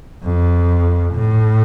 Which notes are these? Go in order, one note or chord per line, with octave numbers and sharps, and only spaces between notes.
F2
A2